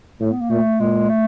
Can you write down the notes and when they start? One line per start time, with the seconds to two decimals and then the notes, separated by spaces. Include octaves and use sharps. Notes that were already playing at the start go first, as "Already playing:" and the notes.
0.21 A2 A3
0.31 B3
0.41 A#3
0.50 A#2 A3
0.80 A#2 G#3
1.10 A3